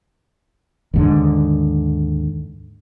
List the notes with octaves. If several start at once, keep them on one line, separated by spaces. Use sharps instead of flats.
D#2 G#2 D3